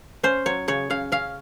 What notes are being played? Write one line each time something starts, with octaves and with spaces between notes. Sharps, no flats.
C#4 C5
F#3 C#5
C#3 C#5
C#3 F5
C#4 F5